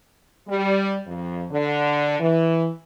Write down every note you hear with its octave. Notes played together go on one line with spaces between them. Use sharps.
G3
F2
D3
E3